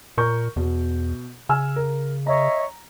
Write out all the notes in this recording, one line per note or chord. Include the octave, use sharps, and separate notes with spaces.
A#2 A#4 C#6 G6
E2 B2
C#3 G#5 E6 F6
A#4
C#5 D#5 E5 A#5